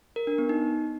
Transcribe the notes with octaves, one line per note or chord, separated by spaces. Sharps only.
A#4
D4
B3
D#4